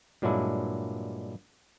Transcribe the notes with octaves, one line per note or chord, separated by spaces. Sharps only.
G2 A#2 F#3 G#3 D4 E4